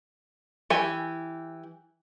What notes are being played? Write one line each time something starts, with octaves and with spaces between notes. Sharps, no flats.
E3 G4 G#5